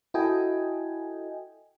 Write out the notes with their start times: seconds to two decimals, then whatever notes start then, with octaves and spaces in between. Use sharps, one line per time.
0.14 E4 F#4 A4 D#5 G5 G#5